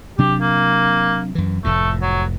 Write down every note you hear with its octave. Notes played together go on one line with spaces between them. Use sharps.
C3 F#3 D4 G4
A#3
F#2 E3
F1 F2 A2 A3
F#3